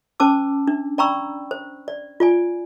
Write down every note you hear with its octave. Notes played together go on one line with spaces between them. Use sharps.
C#4 C5 A5 D6 E6
D4
D5 G5 A#5 B5 C#6 E6
C5
D5
F4 D5 G#5